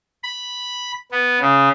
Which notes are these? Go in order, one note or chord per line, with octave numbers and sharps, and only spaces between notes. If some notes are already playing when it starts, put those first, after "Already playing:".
B5
B3
C#3